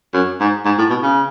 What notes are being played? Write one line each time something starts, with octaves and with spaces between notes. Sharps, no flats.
F#2
G#2
G#2
A2
B2
C#3